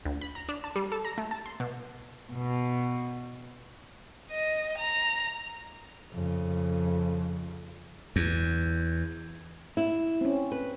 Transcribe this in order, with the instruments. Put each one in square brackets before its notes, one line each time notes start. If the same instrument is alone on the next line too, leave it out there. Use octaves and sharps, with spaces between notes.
[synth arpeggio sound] D2
B5
A#5
D4
A5
G3
A4
A#5
A3
A5
C6
B2
[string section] B2
[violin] D#5
A#5
[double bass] F2 C#3
[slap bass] E2
[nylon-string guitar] E4
[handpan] C4 C#4
[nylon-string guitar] B4